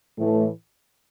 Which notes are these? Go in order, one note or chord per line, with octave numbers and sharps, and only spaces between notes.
A2 E3 A3